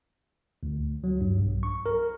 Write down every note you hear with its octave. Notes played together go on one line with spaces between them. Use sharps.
D2
F#3
G2
B1
C#6
A#4